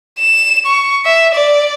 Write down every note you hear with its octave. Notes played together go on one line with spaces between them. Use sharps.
E7
C#6
E5
D5